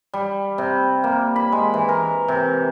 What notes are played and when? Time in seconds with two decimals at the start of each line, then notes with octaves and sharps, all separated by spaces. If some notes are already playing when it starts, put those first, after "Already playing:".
0.14 G3
0.58 C3
1.04 A#3
1.36 B5
1.52 G#3
1.74 E3
1.89 A#4
2.28 C3